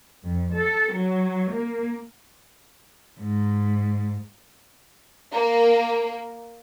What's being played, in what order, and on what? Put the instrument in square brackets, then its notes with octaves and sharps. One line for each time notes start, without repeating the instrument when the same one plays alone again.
[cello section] F2
A4
F#3
A#3
[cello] G#2
[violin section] A#3